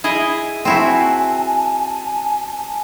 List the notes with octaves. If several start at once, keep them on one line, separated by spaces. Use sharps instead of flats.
E4 G#4 D#5
C4 E4 F#4 G#5 A5